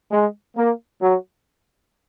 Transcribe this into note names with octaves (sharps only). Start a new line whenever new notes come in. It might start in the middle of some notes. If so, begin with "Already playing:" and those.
G#3
A#3
F#3